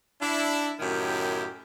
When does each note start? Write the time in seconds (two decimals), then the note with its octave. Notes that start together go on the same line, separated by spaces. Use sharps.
0.22 D4 E4
0.80 F#2 A2 D#3 E4 G4